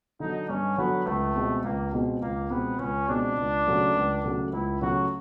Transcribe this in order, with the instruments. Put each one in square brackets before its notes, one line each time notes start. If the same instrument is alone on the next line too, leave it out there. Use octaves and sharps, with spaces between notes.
[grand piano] D3 F#3 [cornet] D#4
[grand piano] G2 [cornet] C#4
[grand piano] D3 F#3 [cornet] B3
[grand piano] C#2 [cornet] A3
[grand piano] B2 G#3 C4
[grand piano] C#2 [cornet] A#3
[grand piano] B2 G#3 C4
[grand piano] C#2 [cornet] A#3
[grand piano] B2 G#3 C4 [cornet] B3
[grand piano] C#2 [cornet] C#4
[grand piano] B2 G#3 C4 [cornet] D4
[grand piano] C#2
C#3 F#3 A3
C#2
C#3 F#3 A3
[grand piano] C#2 [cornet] E4
[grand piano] C#3 F#3 A3 [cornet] F#4